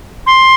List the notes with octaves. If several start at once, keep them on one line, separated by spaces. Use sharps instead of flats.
C6